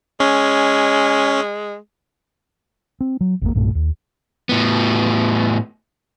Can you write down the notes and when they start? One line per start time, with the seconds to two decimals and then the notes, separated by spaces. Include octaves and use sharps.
0.20 G#3 C#4
3.01 C4
3.21 F#3
3.42 G#1 E2 C3 A#3
3.54 B1 G2 A#2 A3
3.75 D#2
4.49 A2 B3